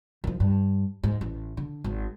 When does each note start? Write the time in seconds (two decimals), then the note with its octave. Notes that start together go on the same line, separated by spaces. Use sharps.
0.24 D#3 F3
0.40 G2
1.03 G#2
1.21 A1
1.57 D3
1.84 G#1